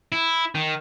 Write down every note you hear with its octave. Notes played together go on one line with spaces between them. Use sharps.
E4
D#3